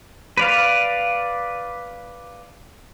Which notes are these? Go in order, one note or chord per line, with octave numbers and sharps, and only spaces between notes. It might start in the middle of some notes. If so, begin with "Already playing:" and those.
B4 D5 F5